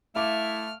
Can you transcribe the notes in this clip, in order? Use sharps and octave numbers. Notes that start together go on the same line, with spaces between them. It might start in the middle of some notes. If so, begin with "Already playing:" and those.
A3 E4 E5 F5 D6 F6